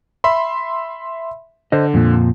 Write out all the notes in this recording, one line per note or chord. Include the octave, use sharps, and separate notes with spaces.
E5 B5 C6
D3 C5 D#5
F2 A#2 F3